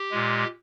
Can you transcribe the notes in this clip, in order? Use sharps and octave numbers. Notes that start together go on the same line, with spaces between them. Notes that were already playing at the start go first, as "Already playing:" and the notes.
Already playing: G4
A#2 G#3